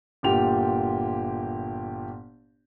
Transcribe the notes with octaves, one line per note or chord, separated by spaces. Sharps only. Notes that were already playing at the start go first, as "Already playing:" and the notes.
G1 A#2 G4 F7